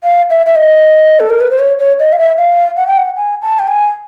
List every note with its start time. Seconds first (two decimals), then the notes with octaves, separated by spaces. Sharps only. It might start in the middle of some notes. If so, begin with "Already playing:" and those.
0.03 F5
0.30 E5
0.46 E5
0.56 D#5
1.20 A4
1.30 A#4
1.40 B4
1.50 C5
1.59 C#5
1.79 C#5
1.99 D#5
2.12 F5
2.19 E5
2.37 F5
2.77 F#5
2.87 G5
2.97 F#5
3.17 G#5
3.42 A5
3.59 G5
3.68 G#5